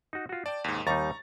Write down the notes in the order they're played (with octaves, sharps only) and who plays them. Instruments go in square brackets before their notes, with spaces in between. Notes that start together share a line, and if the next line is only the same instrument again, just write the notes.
[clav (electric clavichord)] D#4 F#4
F4 F#4
[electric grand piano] D5 [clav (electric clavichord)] G5 A5
[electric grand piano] D#2 G#2
[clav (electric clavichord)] D#2 G3 D#4 [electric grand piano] A#5 C#6 A6